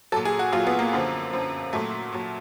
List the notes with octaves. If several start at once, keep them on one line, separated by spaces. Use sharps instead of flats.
A#2 F#3 A4
G#4
F#4
A#2 F#3 F4
B3
A#3
F#2 D3 F3
F#2 D3 F3
A#2 F#3 A3
A#2 F#3